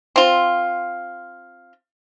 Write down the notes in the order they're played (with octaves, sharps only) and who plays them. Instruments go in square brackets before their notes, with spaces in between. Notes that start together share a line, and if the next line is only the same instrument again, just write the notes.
[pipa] C4 F4